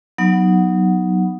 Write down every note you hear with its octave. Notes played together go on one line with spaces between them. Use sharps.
F#3 B3 D#4 F#5